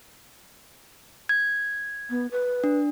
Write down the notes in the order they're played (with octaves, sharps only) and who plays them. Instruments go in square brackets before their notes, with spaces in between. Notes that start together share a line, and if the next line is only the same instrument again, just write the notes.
[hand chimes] G#6
[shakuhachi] B3
B4
[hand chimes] D4